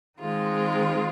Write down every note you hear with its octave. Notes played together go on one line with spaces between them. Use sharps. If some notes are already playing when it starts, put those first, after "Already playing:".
D#3 G#3 C4 F4